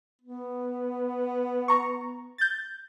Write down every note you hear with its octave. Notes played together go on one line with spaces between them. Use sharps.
B3
A#5 C#6
G6 A6